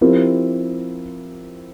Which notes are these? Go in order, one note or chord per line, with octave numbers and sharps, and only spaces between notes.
F3 C4 E4 G4 A#4